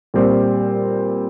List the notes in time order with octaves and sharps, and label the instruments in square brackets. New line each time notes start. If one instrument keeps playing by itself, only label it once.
[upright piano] A#2 G3 C4